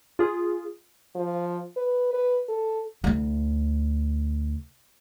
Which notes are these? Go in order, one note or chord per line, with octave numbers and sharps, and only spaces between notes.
F4 G#4
F3
B4
B4
A4
D2 E4